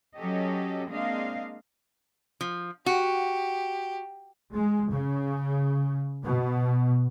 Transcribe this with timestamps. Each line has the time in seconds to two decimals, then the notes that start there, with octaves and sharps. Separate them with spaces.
0.15 F#3 C#4 G4 A4 D#5
0.88 G#3 A#3 C4 D4 D#5 F5
2.41 F3
2.86 F#4 G4
4.53 G#3
4.91 C#3
6.24 B2